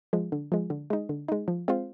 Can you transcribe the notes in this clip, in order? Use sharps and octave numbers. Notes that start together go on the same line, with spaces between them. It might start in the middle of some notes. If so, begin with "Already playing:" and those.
F3 G#3
D3
F3 G#3
D3
G#3 D#4
D3
G#3 D#4
F3
G#3 C4 F4 C5